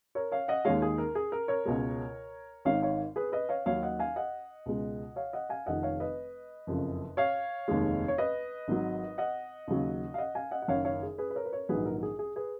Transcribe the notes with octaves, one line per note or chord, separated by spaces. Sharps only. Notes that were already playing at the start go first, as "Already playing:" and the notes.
A#4 C#5
C#5 F5
D#5 F#5
D#2 D#3 G#3 C#5 F5
G#4
A#4
G#4
A#4
A#4 C#5
C#2 B2 G#3
G#1 G#2 D#3 C#5 F5
C#5 F5
G#4 B4
B4 D#5
C#5 F5
D#2 D#3 F#3 C#5 F5
D#5 F#5
F5 G#5
D#5 F#5
C#2 B2 G#3
C#5 F5
D#5 F#5
F5 G#5
F1 F2 D#3 D#5 F#5
C#5 F5
B4 D#5
F#1 F2 C#3
C#5 F5
F1 D#2 D#3 G#3
C#5
B4 D#5
G#1 G#2 F#3
D#5 F#5
D#2 C#3 F#3
F5
D#5 F#5
F5 G#5
D#5 F#5
F#5
F#1 F#2 D#3 C#5 F5
C#5 F5
G#4
G#4 B4
B4
A#4 C#5
B4
A#4 C#5
A#1 G#2 D#3 F#3 G#4 B4
A#4
A#4
G#4
G#4
G#4 B4